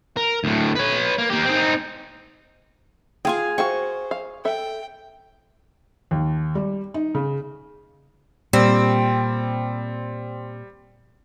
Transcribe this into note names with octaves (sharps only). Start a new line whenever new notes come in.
A#4
D2 A2
B4 C#5
A#3
A#3 G4
C4 D#4
F4 G#4 F5 G5 G#5
F#4 C5 F5 G5 C#6
F5
A4 E5 G5
D#2
G3
D#4
C#3
A#2 G3 C4